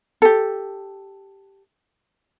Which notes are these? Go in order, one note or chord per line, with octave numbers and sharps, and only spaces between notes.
G4 A4